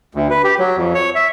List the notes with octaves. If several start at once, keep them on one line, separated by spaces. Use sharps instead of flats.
D2
B4
G4
F#3
F2
C#5
E5